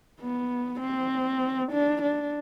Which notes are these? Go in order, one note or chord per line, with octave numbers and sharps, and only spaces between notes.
B3
C4
D4
D4